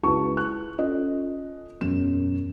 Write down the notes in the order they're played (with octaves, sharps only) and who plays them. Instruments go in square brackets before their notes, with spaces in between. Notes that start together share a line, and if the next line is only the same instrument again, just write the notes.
[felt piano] C#2 E4 F#4 B4 A5 C#6
F#6
C#4 F4 A4 D#5
E1 F#2 E7